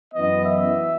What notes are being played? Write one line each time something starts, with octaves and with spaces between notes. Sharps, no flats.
F#2 E3 B3 D#5
E5